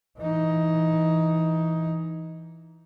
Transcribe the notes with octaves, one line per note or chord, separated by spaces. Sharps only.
E3 D#4